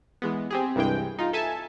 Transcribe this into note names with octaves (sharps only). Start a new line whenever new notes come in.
E3 G#3 B3
C4 G4 G#4
C2 G2 E3 G#3 G5
D#4 F4
A4 E5 G#5 A5